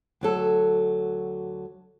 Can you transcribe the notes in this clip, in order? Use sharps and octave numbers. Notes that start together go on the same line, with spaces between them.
D2 F#3 A4